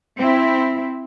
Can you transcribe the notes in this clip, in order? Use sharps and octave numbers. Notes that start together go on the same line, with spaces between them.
C4 E4